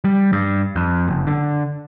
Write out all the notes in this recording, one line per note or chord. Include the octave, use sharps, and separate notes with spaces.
G3
G2
F2
F#1
D3